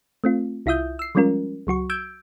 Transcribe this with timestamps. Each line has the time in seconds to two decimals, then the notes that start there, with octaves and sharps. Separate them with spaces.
0.24 A3 C4 F4
0.66 C2 E4 F4 E5 D#6 G6
0.99 E6 C7
1.15 F3 G3 G#3 C#4 F4 A#4
1.67 C#2 F#3 F#4 C#6
1.90 E6 G6 G#6 D7